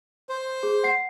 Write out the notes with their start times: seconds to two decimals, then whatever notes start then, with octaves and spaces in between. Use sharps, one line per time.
0.29 C5
0.63 G#4
0.84 F#5 C7